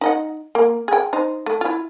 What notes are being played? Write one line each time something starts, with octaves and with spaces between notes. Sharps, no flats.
D#4 D#5 F#5
A#3
G#4 G5
D#4 C5
A3
E4 F4